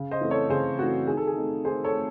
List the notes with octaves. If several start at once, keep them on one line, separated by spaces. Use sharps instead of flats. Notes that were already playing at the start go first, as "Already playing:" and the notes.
Already playing: C#3
C5 D#5
E3 A3 C4
A4 C#5
C#3 G#4 C5
E3 A3 C4 F#4
D#3 G#4
A4
G#4
A3 C4 D#4
D#3 G#4 C5
A4 C#5
A3 C4